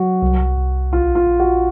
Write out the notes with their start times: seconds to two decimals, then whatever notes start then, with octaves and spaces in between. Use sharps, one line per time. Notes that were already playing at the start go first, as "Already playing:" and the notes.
Already playing: F#3 F#4
0.22 C2
0.58 C2
0.92 A#1 F4
1.15 F4
1.27 A#1
1.40 F#4